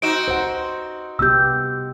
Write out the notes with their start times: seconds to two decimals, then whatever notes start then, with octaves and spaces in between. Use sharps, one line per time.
0.02 C4 D#4 F#4 D7 E7
0.28 C5 F#5
1.19 C3 B3 G4 E6 G6